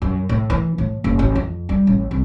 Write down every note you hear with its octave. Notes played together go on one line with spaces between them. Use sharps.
F#2
A2
E3
A2
F#1
A1
F2
G3
A1
C2